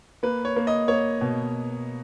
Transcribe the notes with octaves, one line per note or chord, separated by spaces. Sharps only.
A#3 B4
C#5
A#3
D#5
A#3 C#5
B2